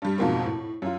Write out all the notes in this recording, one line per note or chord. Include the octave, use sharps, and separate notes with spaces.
G2 G3
F2 G#2 B2 A#3 C4
A2
F#2 F4